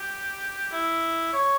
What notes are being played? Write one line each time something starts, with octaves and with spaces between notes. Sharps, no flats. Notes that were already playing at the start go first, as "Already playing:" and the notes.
Already playing: G4
E4
C#5